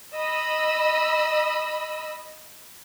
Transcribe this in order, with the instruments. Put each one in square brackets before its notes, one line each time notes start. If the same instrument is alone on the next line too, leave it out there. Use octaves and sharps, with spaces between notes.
[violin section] D#5 B5 E6